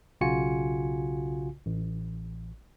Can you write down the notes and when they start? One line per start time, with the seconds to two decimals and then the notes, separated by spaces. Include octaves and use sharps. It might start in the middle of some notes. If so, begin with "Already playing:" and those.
0.21 B1 C#3 F4 F#4 G#5 C#7
1.66 A1